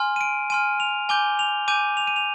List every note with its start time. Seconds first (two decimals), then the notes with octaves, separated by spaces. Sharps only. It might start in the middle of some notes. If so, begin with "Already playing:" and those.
Already playing: G#5 C6 F6
0.16 D#7
0.21 D7
0.50 G#5 C6 F6 D#7
0.80 F7
1.09 G#5 D6 G6 G7
1.39 F7
1.68 G#5 D6 G6 D#7
1.97 F7
2.07 D#7
2.16 F7